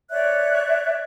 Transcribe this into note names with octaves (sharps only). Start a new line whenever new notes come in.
C#5 D5 E5 F#6